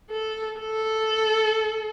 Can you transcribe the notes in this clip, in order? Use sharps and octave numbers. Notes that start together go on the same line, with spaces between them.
A4
A4